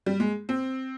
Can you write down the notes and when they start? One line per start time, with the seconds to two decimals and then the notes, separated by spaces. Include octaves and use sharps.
0.06 G3
0.20 G#3
0.49 C4